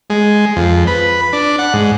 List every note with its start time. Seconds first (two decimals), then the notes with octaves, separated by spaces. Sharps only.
0.10 G#3
0.56 F2
0.87 B4
1.33 D4
1.59 F#5
1.74 G#2